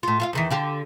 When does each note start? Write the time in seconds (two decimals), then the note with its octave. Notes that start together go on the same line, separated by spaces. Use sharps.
0.03 A2 F4
0.20 F4 E5 F5
0.33 E2 D#3 E3
0.50 D3 F4 G4